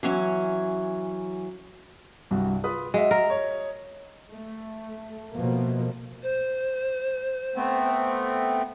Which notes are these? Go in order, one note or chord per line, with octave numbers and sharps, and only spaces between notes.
E3 F#3 C#4
C2 G2 F#4
F4 B4 D#6
G#3 F#4 E5
A#4
C#5
A3
B2 F3 A3 A#3
C5
A3 B3 C4